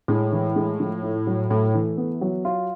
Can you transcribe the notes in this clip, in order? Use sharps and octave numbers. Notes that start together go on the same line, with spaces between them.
A2 G#3
E3
G#3
F3
A3
F#3
A2 A3
E3
B3
F#3
F4